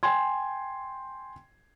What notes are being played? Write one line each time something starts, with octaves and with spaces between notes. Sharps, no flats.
G5 G#5 C6 G#6